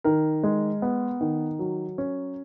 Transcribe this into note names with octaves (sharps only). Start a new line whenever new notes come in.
D#3 A#4
G#3
B3
D#3
F#3
C#4